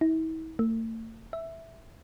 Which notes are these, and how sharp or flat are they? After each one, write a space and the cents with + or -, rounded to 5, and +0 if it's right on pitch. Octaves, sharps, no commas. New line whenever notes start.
E4 -45
A3 +40
E5 -5